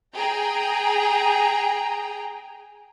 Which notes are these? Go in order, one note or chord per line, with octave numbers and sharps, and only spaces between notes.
G#4 G5 A#5